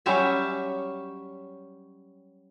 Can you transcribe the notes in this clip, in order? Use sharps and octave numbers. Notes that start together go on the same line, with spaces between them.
F#3 G3 C#4 G4 C#5 E5